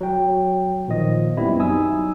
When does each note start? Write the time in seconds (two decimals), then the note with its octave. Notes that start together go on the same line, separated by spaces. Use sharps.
0.01 F#3 G5
0.88 A#2 D#3 F3 D#5
1.37 F#2 G3 B3 C4 E4
1.59 F#3 D#4 G#5 D#6 E6